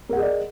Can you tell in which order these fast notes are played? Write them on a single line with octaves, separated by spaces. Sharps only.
A#4 F#5 G#4 D#5 D5